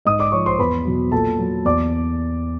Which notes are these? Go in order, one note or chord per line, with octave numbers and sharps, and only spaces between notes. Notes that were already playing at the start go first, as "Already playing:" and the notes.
G#2 D#5 D#6
D5 D6
F3 C#5 C#6
C5 C6
E2 B4 B5
B2 F#3
A#2 A4 A5
F#3
E2 D5 D6